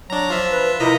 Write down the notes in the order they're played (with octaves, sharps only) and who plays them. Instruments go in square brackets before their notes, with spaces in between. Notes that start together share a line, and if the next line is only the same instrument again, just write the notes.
[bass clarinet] F#3 [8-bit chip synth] D4 A#5
[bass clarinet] F3 [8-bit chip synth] F4 E5
[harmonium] B4
[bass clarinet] C3 [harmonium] E4 F4 A#4 [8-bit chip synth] D#5 A#5 B6